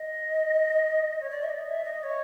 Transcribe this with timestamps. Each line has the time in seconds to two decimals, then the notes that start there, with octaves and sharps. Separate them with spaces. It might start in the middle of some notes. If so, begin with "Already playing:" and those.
Already playing: D#5
1.21 C#5
1.31 D5
1.43 E5
1.49 D#5
1.68 E5
1.85 D#5
2.03 C#5